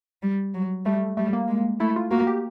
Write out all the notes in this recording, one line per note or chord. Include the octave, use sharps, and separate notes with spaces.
G3
F#3
G3 A3
G3 A3
A#3
G#3
A3 E4
F4
A#3 F#4
G4